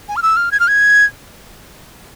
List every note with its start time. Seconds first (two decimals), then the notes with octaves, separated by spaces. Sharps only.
0.09 G#5
0.16 F6
0.23 E6
0.37 F6
0.52 G#6
0.60 F6
0.68 G#6